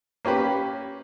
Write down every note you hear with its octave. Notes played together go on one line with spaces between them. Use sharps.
A#3 C#4 G4 B4